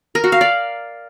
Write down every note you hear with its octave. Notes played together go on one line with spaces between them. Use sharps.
A#4
F#4
F5
D5